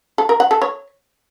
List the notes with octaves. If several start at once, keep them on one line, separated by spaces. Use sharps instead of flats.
A4
A#4
F#5
A4
C#5